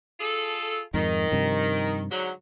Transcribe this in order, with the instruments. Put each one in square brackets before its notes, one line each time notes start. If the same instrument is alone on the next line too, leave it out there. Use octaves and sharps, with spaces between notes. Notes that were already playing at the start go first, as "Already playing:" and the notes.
[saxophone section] F4 G#4 A4
[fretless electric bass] F2 G#2 [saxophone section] D#3
[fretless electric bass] G2 C3 F3
[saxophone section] G#2 D3 F#3